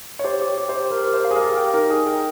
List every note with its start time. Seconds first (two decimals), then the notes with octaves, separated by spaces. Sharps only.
0.19 C#5
0.24 G4 C5
0.42 G4
0.47 C#5
0.58 G4
0.69 C5
0.75 G4
0.91 A#4 C5
1.08 G4
1.14 C5
1.25 F5
1.31 G#4
1.36 A#4
1.41 G4
1.57 A#4 G5
1.74 D#4 A#4
1.90 D#4 G#4
2.06 A#4 G5